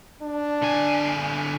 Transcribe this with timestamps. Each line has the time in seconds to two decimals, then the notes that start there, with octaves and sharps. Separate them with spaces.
0.22 D4
0.62 D3 G#5